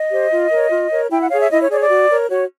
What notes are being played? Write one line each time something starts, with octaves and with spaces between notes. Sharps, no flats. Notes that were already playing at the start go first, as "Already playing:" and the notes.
Already playing: D#5
G4 C5
F4
A#4 C#5
F4
A#4 C#5
E4 G5
F#5
G#4 C#5 F5
E5
E4 D#5
C#5
G#4 C#5 D5
D5
F#4
A#4 C#5
F#4 C#5